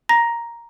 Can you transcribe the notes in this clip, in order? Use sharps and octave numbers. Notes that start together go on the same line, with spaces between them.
A#5 A#6